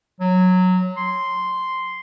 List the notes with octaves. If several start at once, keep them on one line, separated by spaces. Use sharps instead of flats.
F#3
C6